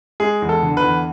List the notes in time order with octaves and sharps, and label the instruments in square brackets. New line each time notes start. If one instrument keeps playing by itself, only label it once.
[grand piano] G#3 G#4
E2
A4
D3
B4
E2